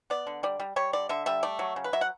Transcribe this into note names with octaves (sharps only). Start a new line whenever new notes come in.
B3 D5
D3
G3 D5
G3
G3 C#5
D3 D5
D3 E5
G3 E5
A3 D5
F#3
C#3
B4
F#3 E5
F#5